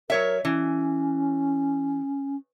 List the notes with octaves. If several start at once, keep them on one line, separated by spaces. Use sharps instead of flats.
F#3 A#4 C#5 E5
E3 C#4